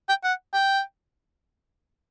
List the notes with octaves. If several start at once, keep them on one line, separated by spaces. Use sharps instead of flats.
G5
F#5
G5